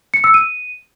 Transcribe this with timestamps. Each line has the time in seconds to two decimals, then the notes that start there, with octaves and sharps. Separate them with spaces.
0.14 C#7
0.24 E6
0.34 D#7